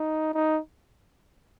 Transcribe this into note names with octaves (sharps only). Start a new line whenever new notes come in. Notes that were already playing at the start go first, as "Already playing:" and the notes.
Already playing: D#4
D#4